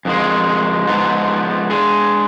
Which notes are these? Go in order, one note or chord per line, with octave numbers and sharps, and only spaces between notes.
F2 D#3 G#3
G#2 F3 B3 D#4
G#3 D4 G#4